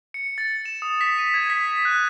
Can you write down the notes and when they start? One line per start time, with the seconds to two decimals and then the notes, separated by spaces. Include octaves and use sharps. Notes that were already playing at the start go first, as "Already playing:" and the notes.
0.14 C#7
0.38 A6
0.66 E7
0.82 D#6
1.01 B6
1.18 D#7
1.34 G#6
1.50 B6
1.85 F#6